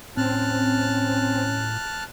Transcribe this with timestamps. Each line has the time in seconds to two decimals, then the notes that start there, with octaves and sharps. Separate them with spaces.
0.17 A2 C4 C#4 A5 F6 F#6